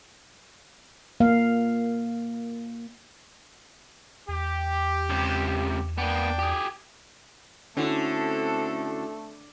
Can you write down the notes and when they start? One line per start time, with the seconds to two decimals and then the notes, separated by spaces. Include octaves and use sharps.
1.20 A#3 F5
4.28 E2 G4
5.10 C#2 C3
5.98 A#3 B3 D4 D5 G5
6.39 G4 G#4
7.77 D3 A3 C4 C#4 E4 F#4 A4